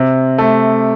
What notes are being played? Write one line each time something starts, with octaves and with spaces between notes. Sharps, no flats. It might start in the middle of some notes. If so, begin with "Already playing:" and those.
Already playing: C3
A3